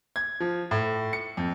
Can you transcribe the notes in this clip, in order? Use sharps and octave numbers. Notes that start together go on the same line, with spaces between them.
G#6
F3
A2
C#7
F2